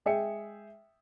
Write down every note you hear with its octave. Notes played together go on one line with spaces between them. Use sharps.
G#3 G#4 E5 G5 C#7